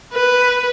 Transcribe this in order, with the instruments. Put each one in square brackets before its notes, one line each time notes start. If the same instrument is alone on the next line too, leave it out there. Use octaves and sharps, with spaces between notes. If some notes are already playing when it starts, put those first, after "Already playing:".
[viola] B4